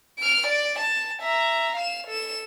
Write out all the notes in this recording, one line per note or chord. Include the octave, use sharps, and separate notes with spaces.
F6 D7
D5
A5
E5 A#5
F5 E7
A4 E7